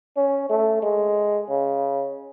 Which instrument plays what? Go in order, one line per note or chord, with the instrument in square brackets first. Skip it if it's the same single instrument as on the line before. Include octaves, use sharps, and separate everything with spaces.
[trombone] C#4
A3
G#3
C#3